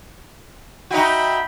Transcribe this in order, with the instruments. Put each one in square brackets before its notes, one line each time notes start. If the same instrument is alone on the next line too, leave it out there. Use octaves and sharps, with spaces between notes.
[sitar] D#4 F#4 [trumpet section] E5 G5 B5